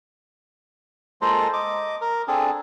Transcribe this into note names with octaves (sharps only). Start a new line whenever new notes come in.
G#3 A#3 F4 A4 C5 A#5
D#5 D6
A#4
C4 D4 G#4 A4